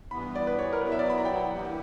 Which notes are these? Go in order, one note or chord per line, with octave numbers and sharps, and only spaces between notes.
G2 E3 B3 B5
D5
B4
C#5
A#4
B2 F#3 B3 E4 B4
E5
D5
B5
A#5
G5
F#5
G2 E3 A#3 E4 G4 F#5